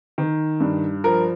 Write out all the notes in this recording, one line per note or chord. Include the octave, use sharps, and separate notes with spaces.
D#3
G2
F3 A#4